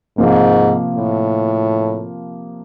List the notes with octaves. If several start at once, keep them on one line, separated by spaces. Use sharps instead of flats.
G#2 C3 F3 A#3
A2